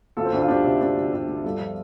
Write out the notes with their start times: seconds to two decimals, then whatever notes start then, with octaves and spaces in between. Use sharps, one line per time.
0.17 D2 F4 A4
0.25 C4
0.32 D2 D4
0.41 F4
0.48 D2 D4 G4
0.64 C3
0.81 D2 D4
0.97 D2
1.13 D2 D4 G4
1.28 D2
1.44 G2 F4 A4
1.60 F3